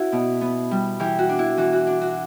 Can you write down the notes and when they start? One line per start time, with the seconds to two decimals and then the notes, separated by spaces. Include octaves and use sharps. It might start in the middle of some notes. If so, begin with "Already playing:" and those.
Already playing: C#4 E4 F#4
0.12 B2
0.41 B3
0.71 G3
1.00 E3 G4
1.19 F#4
1.29 D4
1.39 E4
1.57 E3 F#4
1.73 F#4
1.87 D4
2.01 F#4